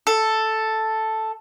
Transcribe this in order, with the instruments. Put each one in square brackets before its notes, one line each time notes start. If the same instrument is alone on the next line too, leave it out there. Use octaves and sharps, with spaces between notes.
[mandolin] A4